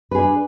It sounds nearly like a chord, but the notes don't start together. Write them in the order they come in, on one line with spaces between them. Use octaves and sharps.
B4 G#4 D4